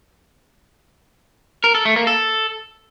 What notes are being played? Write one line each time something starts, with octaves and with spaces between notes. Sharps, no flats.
A#4
A4
A3
A#3
A4